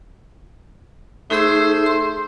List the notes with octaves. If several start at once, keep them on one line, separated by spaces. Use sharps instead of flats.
A3 D#4 G#4 C5 E6
C6